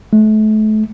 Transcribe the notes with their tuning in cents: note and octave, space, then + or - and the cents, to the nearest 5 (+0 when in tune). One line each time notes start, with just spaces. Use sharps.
A3 -35